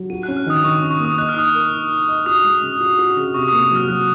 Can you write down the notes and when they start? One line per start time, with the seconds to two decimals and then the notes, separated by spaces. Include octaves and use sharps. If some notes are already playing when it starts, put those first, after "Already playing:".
Already playing: F#3
0.10 F#4 D#7
0.23 F#6
0.28 C#4
0.37 F6
0.46 D#3 D#6
0.64 D#3 C#6
0.82 C#4
0.91 C#6
1.00 A#3
1.05 D#6
1.18 D#5 F#6
1.29 F6
1.36 D#4 D#6
1.49 A#4 F6
1.73 D#4
1.90 D#4
2.08 D#5
2.26 F#4 D#6
2.44 G#3
2.62 C#3
2.80 F#4
2.98 F#4
3.17 C#3
3.34 C3 C#6
3.48 A#3 D#6
3.71 F#3 F6
3.88 F#3 F#6